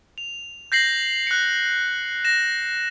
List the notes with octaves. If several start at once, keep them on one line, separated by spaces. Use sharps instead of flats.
F7
G6 A#6 C7 F#7
F#6 C#7
A#6 E7